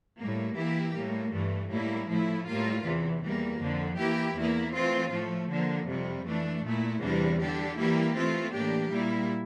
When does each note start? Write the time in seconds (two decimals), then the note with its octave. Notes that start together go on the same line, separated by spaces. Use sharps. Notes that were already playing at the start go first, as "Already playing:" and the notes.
0.18 A2 G3 A#3
0.56 E3 A#3 E4 G4
0.94 A2 G3 A#3
1.32 G2 E3 A3
1.70 A2 G3 A#3 E4
2.09 A2 F3 A3 E4
2.47 A2 G3 A#3 F4
2.84 E2 C3 E3
3.22 E2 E3 G3 A#3
3.60 F2 D3 F3
3.98 E3 A#3 E4 G4
4.35 E2 E3 A#3 E4
4.74 E3 A3 C4 F4
5.12 A2 F3 A3
5.49 D3 F3 A#3
5.87 F2 C3 G3
6.26 E3 A3 D4
6.64 A#2 A3 E4
7.01 E2 C3 E3 G3 D4
7.39 D3 G3 D4 G4
7.76 E3 G3 A#3 E4 G4
8.15 E3 A3 C4 F4
8.53 A2 E3 A#3 D4 G4
8.91 A#2 G3 A#3 E4